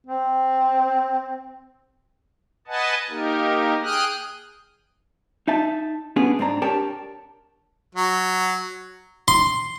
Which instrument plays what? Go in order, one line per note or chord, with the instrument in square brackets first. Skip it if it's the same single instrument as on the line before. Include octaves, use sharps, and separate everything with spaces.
[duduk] C4
[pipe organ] B4 D#5 F#5 G#5 A5
A#3 D#4 G4 A#4
G#4 G5 D#6 F6 F#6
[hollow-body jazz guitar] D#4 E5 A5
A3 B3 C#4 D4 G#4
G#2 C4 D4 A#5
D4 G4 A#4 C#5 G5 A5
[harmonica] F#3
[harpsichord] C6